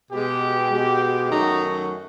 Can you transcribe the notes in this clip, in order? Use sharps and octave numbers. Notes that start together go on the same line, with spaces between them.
B2 G#3 G4
B2 G#3
F#2 D#3 F#3 A3 D#4